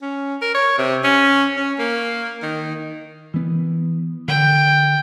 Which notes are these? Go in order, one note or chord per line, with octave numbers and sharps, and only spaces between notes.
C#4
A#4
C#5
C3
C#4
C#4
A#3
D#3
E3 B3
D3 G5